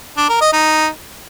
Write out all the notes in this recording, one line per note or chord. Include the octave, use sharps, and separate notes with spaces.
D4
A#4
D#5
D#4